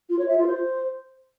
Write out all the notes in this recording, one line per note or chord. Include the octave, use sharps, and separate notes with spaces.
F4
C#5
E5
F4
C5